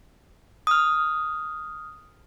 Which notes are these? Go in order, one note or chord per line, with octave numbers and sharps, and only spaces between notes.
D#6 F6